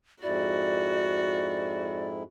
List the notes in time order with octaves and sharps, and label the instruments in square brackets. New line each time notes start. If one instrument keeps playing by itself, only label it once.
[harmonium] F2 G#2 E4 [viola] F#4 [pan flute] D5